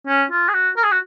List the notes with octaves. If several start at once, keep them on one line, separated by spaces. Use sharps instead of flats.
C#4
F4
G#4
F#4
A#4
G#4
F#4